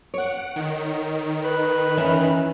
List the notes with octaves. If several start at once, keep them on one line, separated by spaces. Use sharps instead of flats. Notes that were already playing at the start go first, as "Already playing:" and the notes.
C#5 F#5 D7
D#3
B4
E3 C#4